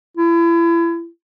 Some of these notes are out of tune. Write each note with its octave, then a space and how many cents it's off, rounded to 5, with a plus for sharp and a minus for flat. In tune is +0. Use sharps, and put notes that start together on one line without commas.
E4 +35